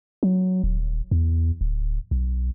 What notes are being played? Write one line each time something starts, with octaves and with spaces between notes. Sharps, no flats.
F#3
D#1
E2
D1
B1